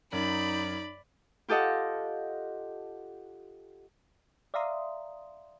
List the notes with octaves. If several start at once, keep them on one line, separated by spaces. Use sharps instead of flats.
F#2 D#4 D5 B5
F4 G4 A4 D#5 F#5
D5 E5 F5 A#5 C6 D#6